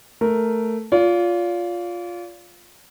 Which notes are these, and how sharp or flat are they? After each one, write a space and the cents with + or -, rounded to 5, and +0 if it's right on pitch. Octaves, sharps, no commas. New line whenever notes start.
A3 +0 A#4 +0
F4 +5 D5 -40